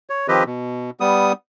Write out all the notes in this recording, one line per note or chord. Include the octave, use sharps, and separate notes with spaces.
C#5
D#3 F3 C4 G4 B4 D#5
B2
G3 B3 D#6